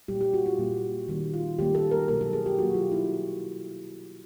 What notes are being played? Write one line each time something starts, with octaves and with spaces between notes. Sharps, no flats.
A#2 G3 A#3 G4
G4
F#4
F4
A#2 G3 A#3
D#3 G3 A#3
F4
D#3 G3 A#3 G4
A4
A#4
B2 F#3 A#3 A#4
A4
G#4
G4
B2 F#3 A#3 F#4
F4
E4